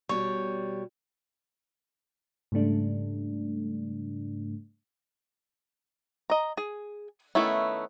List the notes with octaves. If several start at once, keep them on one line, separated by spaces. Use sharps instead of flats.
B2 G3 C#5
G#2 C#3 G3 A3 D4
D#5 A#5
G#4
D#3 A3 B3 C#4 E4